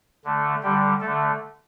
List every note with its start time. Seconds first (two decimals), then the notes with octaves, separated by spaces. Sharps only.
0.24 D3 A3
0.62 D3 G3 G4
1.00 D3 A3 A4